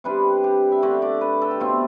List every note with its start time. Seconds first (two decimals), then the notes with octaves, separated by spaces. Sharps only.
0.04 C3 G3 D4 B4
0.44 G4
0.72 E5
0.82 D3 A3 D4 D5
1.02 D5
1.21 B4
1.42 A4
1.51 G4
1.60 B2 A3 C4 F4